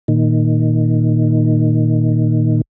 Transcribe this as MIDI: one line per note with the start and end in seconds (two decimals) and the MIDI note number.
0.08 2.61 46
0.08 2.61 51